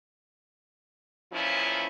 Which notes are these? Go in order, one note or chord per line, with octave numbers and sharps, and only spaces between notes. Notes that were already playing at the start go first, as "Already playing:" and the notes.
E2 A#2 F3 C#4 E4